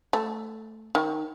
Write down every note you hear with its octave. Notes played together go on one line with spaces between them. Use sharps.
A3
D#3